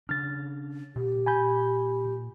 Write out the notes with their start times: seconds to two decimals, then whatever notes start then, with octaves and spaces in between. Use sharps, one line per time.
0.09 C#3 D4 F6 A6
0.96 A#2 G4
1.26 G#5 B5 G6